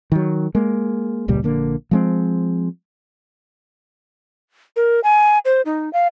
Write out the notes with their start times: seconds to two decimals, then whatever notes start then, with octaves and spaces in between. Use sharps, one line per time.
0.12 D#3 F#3
0.55 G#3 A#3
1.28 E1 C#2 A#2 G3
1.43 A#1 D3 A#3
1.91 F3 G#3 C4
4.76 A#4
5.04 G#5
5.45 C5
5.66 D#4
5.93 F5